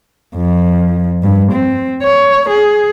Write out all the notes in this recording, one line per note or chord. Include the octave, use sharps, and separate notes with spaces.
F2
G2
C4
C#5
G#4